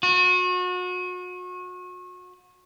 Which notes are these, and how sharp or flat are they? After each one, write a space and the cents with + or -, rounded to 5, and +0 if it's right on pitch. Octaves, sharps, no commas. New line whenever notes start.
F#4 -35